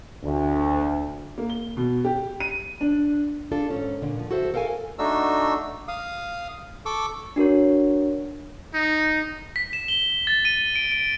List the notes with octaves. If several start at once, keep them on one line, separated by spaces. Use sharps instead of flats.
D2
A#3
G7
B2
G4
D#7
D4
D4 F4 A4
G#2 C#4
A#2 D3
F3
F#4 A4 C5 E5
A4 A#4 F5 G5 G#5
A3 D4 D#4 F#4 E6
F5 D#6
A4 C#6 D6 E6
D4 F#4 A#4 C#5
D#4
B6
E7
G7
A6
D#7
D7
D7